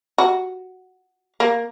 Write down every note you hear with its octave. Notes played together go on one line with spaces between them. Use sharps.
F#4
A#3